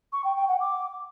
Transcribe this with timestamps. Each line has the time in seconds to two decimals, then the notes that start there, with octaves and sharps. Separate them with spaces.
0.13 C#6
0.24 G5
0.36 G5
0.48 F#5
0.60 D6